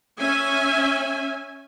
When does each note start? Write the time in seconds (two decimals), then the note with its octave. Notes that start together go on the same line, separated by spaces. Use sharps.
0.20 C#4 E5 G#5